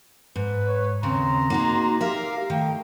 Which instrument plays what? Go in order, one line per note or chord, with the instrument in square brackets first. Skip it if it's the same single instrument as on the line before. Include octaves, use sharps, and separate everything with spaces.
[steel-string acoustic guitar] G#2 [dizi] B4
[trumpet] C#5
[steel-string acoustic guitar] D#2 C#3 C4 [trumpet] A#5 [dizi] C6
[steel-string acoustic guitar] A#3 F#4 G#4 [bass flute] D#4
[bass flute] G4 [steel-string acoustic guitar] A#4 E5 [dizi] F5
[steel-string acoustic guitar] D#3 [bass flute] A3 [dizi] G5